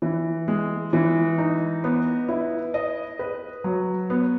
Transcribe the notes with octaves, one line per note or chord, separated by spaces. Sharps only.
E3
G#3
E3
D#4
B3
E4
D#5
B4
F#3
B3